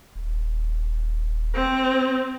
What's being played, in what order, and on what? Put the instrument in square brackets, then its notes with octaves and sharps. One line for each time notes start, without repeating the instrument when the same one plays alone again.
[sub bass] D#1
[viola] C4